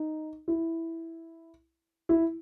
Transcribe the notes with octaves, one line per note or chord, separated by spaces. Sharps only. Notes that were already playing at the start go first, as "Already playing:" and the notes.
Already playing: D#4
E4
E4